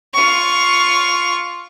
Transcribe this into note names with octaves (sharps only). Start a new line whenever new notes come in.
F4 C#6